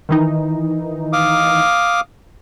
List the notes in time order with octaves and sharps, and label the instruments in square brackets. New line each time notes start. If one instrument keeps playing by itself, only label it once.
[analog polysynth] D#3 E3 D#4
[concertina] F5 D6 D#6